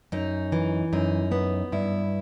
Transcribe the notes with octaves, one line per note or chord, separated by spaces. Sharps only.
F#2 D#4
E3
F#2 D#4
B3
G2 E4